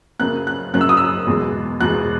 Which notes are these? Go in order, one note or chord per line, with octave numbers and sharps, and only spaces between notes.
F#2 C#3 F#3 A#3 F#6
F#6
F#2 C#3 F#3 A#3 F#6
E6
D#6
E6
E2 B2 G#3
E2 B2 G#3 F#6